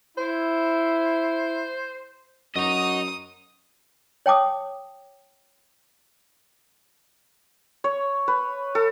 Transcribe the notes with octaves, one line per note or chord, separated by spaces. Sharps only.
E4 C5
F#2 F#4 D#5 A#5 D#6
C#5 G5 A5 D6 D#6
C#5
B4
A4